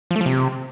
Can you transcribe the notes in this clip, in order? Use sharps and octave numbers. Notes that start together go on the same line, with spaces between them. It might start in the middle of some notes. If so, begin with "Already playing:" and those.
F3
A3
F3
C3